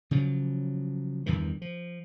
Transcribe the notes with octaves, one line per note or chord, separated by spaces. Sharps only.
C#3 F3 F#3
E2 G2 D#3 E3
F3